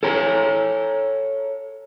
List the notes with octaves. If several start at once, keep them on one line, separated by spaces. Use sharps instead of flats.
A4 C#5 A#5